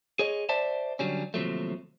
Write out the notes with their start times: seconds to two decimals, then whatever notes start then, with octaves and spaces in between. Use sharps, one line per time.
0.19 G#4 C#5 D#5
0.49 C5 D5 E5 A5
0.99 D3 F#3 G3 C#4
1.34 D#2 C3 F3 F#3 A3